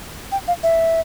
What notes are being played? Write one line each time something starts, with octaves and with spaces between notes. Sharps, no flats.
G5
F5
E5